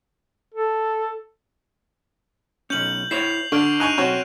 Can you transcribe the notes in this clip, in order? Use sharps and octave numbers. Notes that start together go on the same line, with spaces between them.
A4
B1 C#4 G6 F#7
E4 C5 C#5 C7 F7
D3 D4 C#6 F6 D7
D#4 G#5 C#6 F#6 D#7 F7
B1 C4 C#4 F#4